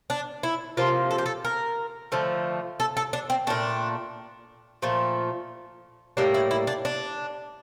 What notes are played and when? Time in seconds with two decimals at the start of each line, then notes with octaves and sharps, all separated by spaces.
0.10 D4
0.43 E4
0.77 C3 F3 A#3 F4
1.11 A4
1.18 G4
1.26 A4
1.45 A#4
2.12 D3 F3 A3
2.80 A4
2.97 A4
3.13 D4
3.30 C4
3.47 A#2 A3 D4
4.82 A#2 F3 A3
6.17 A2 G3 A#3 D4
6.34 E4
6.51 E4
6.67 D4
6.85 D4